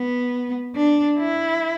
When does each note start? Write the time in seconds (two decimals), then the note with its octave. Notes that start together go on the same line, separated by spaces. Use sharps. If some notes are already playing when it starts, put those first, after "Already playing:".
Already playing: B3
0.76 D4
1.19 E4